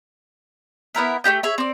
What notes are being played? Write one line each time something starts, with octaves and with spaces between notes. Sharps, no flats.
B3 E4 A#4 E5
A3 D#4 G4 G6
G#4 C#5 E5
C4 D5